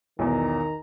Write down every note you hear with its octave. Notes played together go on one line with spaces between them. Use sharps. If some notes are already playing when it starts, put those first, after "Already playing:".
B1 E2 D#3 A#5